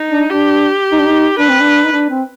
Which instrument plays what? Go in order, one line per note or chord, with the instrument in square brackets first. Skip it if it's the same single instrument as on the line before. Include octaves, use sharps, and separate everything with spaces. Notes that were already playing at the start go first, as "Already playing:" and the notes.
Already playing: [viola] D#4
[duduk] D4
[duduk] D4 [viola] G4
[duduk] D#4
D4
D#4
[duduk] D4 [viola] B4
[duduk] C4
D4
D#4
D4
C4